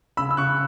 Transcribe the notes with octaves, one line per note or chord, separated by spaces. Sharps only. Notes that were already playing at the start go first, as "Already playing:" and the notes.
C#3 B5 E6
E6
C#3 C#6 F#6